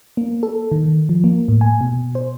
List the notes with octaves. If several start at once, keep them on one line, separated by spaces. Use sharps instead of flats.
A#3
A4
D#3
F3
A#3
A2
G#5
B2
C5